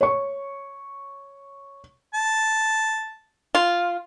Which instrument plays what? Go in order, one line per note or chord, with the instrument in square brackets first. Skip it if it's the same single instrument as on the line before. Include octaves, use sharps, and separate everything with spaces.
[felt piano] C#5 C#6
[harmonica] A5
[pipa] F4